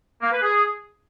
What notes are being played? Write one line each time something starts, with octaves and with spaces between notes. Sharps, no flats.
A#3
B4
G#4